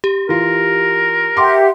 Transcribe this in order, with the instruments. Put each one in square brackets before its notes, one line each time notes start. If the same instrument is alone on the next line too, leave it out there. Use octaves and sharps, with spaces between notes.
[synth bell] G4
[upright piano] E3 F4 [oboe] A#4
[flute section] G4 E5 F#5 [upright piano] C6 D6